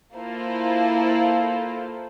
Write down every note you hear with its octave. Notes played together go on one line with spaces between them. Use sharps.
A#3 E4 F4 A4 C5